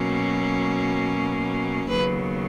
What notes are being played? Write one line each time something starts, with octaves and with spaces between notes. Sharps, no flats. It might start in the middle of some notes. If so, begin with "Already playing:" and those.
Already playing: B2 F#3 A#3 C#4
D#2 C#3 F#3 B3 B4